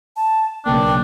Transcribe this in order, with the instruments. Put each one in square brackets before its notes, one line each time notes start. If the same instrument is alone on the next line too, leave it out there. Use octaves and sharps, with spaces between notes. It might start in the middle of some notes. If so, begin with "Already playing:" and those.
[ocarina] A5
[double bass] B1 C#3 [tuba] A#3 [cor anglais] D4 [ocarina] G5